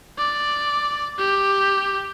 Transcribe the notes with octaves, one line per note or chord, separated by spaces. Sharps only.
D5
G4